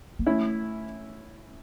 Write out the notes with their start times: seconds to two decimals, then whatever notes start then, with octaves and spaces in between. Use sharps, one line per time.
0.19 A#3
0.26 A3 C#4 E4